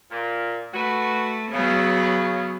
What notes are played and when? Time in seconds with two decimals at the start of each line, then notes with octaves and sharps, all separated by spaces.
0.11 A#2
0.74 A3 F#4 B4
1.52 C#3 F#3 B3